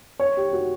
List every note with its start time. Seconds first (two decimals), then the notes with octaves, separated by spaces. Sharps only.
0.20 C#5
0.37 G4
0.53 F#4